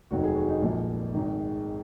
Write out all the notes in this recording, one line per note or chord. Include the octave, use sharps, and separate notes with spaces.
F1 D#2 D#3 F#3 F#4
G#4
F#4
D#4
A#1 A#2 F3 G#3
G#1 G#2 D#3